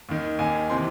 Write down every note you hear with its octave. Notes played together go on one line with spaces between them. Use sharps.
D#2 D#3
D#2 D#3 G#5
C3 E3 C6